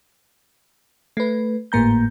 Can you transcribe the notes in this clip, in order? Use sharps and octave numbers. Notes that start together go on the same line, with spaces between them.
A3 B4
G#1 A2 A#3 A#5 G6